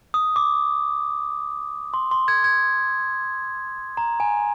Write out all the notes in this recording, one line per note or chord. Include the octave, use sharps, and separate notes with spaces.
D#6
D6
C6
C6
G#6
G#6
A#5
G#5